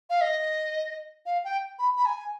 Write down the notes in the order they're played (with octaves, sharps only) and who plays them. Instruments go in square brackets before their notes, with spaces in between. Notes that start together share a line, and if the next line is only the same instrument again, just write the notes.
[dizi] F5
D#5
F5
G5
B5
B5
G#5